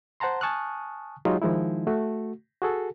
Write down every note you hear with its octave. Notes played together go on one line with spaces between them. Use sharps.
C5 F#5 A5 A#5 C6
G#5 A5 C#6 D#6 F6 F#6
F#3 G#3 D#4 F4 G4 G#4
D#3 F3 G#3 D#4 E4
A3 F#4
F#4 G#4 A4